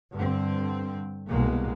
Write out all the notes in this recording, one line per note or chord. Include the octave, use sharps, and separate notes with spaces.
G2 D3 C4
C2 B2 G#3 A#3